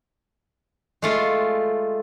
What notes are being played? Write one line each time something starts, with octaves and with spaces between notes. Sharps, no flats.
G#3 A3 F4